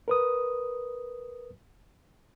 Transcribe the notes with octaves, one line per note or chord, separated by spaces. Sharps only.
A#4 B4 D#6